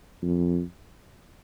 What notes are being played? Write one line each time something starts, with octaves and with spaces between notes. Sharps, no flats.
F2